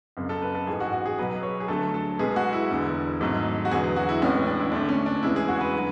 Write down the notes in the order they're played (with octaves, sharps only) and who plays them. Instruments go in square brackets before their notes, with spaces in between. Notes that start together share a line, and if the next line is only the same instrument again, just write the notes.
[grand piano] F#1 F#2 C#3
A4
B4
A4
A1 G#2 E3 G#4
F#4
F#4
G#4
B1 B2 F#3 B3 B4
B4
C#5
G#4
D2 D3 F#3 A3 A4
A4
B1 B2 G#3 B3 G#4
F#4
E4
E1 E2 D3
G#1 G#2 F#3 A3
F#4
E2 D3 F#3 B3 G#4
G#4
F#4
E4
A1 A2 G#3 B3 C#4
C#4
D4
E4
D2 D3 A3 D4
C#4
D4
E2 C#3 G#3 E4
G#4
F#4
B4
D3 F#3 B3